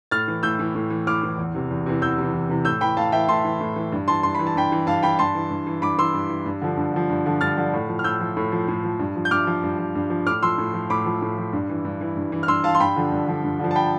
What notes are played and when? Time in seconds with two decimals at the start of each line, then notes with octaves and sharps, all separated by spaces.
0.11 A2 F6 A6
0.28 E3
0.43 A2 E6 G6
0.59 E3
0.75 A2
0.90 E3
1.07 A2 D6 F6
1.23 E3
1.38 E2
1.54 C3 E3
1.71 E2
1.86 C3 E3
2.02 E2 E6 G6
2.18 C3 E3
2.33 E2
2.49 C3 E3
2.65 A2 E6 G6
2.81 E3 G5 B5
2.97 A2 F5 A5
3.12 E3 E5 G5
3.28 A2 A5 C6
3.45 E3
3.61 A2
3.76 E3
3.92 G2
4.08 E3 A5 C6
4.23 G2 C6
4.35 E3 B5
4.47 A5
4.56 G2 G5 B5
4.72 E3
4.87 G2 F5 A5
5.03 E3 G5 B5
5.19 G2 A5 C6
5.35 E3
5.50 G2
5.67 E3
5.82 G2 B5 D6
5.98 E3 C6 E6
6.14 G2
6.29 E3
6.46 G2
6.62 D3 F3
6.77 G2
6.94 D3 F3
7.09 G2
7.26 D3 F3
7.41 G2 F6 A6
7.57 D3 F3
7.73 A2
7.89 F3
7.99 F6
8.04 A2 E6 G6
8.20 F3
8.37 A2
8.52 F3
8.68 A2
8.84 F3
8.99 G2
9.16 F3
9.25 G6
9.31 G2 D6 F6
9.47 F3
9.64 G2
9.79 F3
9.95 G2
10.10 F3
10.27 A2 D6 F6
10.43 F3 C6 E6
10.58 A2
10.74 F3
10.90 A2 B5 D6
11.06 F3
11.22 A2
11.38 F3
11.53 G2
11.69 E3
11.85 G2
12.01 E3
12.17 G2
12.32 E3
12.43 F6
12.48 G2 C6 E6
12.64 E3 F5 A5
12.75 C6
12.80 G2 G5 B5
12.96 D3 F3
13.12 G2
13.28 D3 F3
13.43 G2
13.59 D3 F3
13.71 A5
13.75 G5 B5